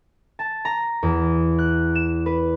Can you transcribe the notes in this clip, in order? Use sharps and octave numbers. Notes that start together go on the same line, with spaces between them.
A5
A#5
E2
F#6
E7
B4